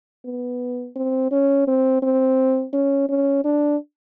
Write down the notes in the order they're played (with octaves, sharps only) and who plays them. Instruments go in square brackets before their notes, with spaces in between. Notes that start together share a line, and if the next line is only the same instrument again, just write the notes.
[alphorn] B3
C4
C#4
C4
C4
C#4
C#4
D4